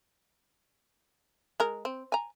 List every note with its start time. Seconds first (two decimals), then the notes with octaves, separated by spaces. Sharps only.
1.60 G#3 A#4
1.85 C4
2.12 G#5 A#5